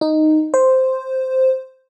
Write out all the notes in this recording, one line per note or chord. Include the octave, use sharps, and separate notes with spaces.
D#4
C5